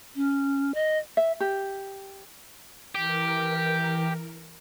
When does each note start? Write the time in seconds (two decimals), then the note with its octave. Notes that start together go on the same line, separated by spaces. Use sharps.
0.16 C#4
0.74 D#5
1.17 E5
1.40 G4
2.95 E3 G4 A#4